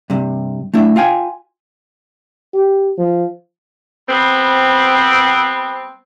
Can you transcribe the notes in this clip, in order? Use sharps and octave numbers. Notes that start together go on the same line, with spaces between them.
G2 C3
A3 D4 E4 E5
F4 F5 G5 G#5
G4
F3
G3 B3 C4